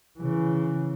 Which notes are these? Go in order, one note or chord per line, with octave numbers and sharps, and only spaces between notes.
C#3 E3